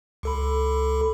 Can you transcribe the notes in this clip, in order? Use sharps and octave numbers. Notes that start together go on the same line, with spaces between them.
C#2 A4 B5